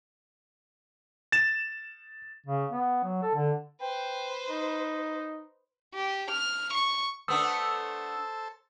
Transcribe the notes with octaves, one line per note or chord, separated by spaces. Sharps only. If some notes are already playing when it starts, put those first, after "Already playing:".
A6 E7
C#3
B3
F#3
A4
D3
B4 C5 G5
D#4
G4
F6
C#6
A3 B3 D4 A4 C5 A5 D#6 E6